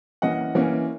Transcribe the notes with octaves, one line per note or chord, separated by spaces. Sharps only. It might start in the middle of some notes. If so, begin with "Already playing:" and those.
E3 A#3 C#4 D#5 F#5
E3 A#3 C#4